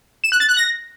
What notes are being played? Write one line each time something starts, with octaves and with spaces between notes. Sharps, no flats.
E7
F#6
A6
F#6
A#6